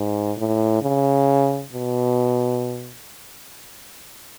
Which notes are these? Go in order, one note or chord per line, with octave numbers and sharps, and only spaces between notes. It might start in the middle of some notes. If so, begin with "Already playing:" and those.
Already playing: G#2
A2
C#3
B2